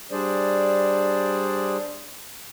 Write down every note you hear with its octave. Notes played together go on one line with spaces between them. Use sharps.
G3 D4 G#4 C5 D5